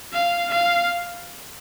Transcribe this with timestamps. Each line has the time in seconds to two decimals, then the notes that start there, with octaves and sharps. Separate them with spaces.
0.13 F5
0.51 F5